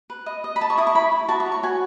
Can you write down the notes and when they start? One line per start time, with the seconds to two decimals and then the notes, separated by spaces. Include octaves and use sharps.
0.10 B4
0.26 D#5
0.44 D#5
0.56 B5
0.61 D#5 A5
0.70 C#6
0.78 E4 D#6
0.87 C#6
0.95 E4 B5
1.12 E4
1.29 F#4 A5
1.40 C#6
1.46 C#5
1.52 C#6
1.63 F#4 G#5